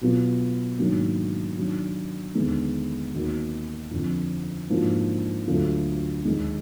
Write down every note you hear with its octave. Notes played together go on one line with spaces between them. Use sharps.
B2 F#3 B3 F4
G#2 D#3 F#3 A#3 D4
D#3 F#3 D4
D#2 D3 G#3 B3
D#2 D#3 A#3 D#4 F#4
F2 D3 F3
G#2 F3 A#3 D4 F#4
D2 D3 F#3 D4 F4
D#2 D#3 G#3 D#4